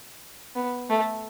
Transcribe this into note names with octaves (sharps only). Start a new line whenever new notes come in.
B3
A3